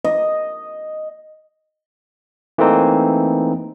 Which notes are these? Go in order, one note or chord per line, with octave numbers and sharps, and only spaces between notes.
D#5
E3 A3 A#3 C4 D#4